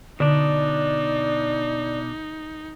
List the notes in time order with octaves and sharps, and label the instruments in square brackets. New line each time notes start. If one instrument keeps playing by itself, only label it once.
[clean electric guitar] B2 D4 [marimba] D3 [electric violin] D#4 [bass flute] D5